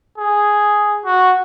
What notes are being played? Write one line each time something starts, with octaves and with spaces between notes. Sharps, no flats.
G#4
F#4